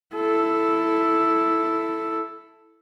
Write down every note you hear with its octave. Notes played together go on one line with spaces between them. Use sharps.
E4 A4